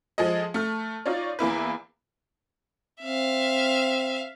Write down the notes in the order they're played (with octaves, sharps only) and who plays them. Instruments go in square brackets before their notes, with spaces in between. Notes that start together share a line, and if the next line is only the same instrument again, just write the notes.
[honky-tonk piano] F3 G#3 G#4 A4 D#5
A3 F6
D#4 F4 C#5 D5
E2 A#3 E4 B4
[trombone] C4 [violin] E5 F5